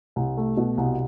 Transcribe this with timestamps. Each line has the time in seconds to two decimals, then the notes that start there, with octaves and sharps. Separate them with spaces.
0.16 C2
0.37 A3
0.57 B2
0.78 C2